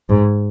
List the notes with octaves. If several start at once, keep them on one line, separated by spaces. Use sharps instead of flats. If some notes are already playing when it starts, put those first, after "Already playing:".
G#2